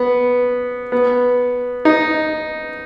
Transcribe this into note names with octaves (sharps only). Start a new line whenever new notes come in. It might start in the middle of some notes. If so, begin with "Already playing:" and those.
Already playing: B3
B3
D#4